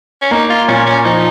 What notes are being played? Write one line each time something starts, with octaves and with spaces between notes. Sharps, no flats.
C#4
A#3 D#4
F4
A#2 C#4
C#4
F3 D#4